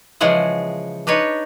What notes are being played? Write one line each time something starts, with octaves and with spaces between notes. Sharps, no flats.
C#3 E3 F3 G#3 G#4 F#5
D4 D#4 B4 C#5